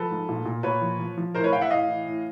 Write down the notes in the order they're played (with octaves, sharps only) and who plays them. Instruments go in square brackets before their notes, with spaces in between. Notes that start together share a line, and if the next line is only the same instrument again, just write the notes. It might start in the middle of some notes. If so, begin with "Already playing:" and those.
Already playing: [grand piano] F3 A4 B4
G#2
A#2
A#2
A#2 B4 C#5
F3
F3
F3
A2 A#4 C5
B4 C#5
A2 F5 G5
E5 F#5
A2 D#5 F5
E3
A2